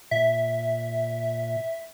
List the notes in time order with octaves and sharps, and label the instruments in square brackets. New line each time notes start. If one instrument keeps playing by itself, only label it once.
[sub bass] A#2 [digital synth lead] E5